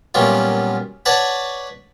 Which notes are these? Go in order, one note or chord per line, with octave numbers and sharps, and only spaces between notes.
F#2 A#2 F#3 G3 B3 F4
B4 C#5 D5 F#5 A5 C#6